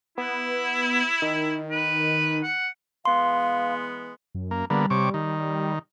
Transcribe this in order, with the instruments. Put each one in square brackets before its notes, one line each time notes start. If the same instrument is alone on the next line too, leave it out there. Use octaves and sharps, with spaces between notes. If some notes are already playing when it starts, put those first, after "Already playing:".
[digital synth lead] B3 [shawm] E4
[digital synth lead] D#3
[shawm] B4
F#5
[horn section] E3 G#3 B3 [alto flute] F5 [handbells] C6
[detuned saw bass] F#2
[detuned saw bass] F#2 [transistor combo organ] A#3
[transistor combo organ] D3 A#3 B3 [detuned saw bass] G3
[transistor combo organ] C3 C#5 D6
D#3